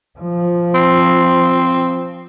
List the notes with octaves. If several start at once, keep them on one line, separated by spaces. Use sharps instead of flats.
F3
C4